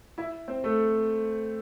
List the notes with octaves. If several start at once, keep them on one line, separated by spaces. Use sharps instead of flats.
E4 E5
C4 C5
A3 A4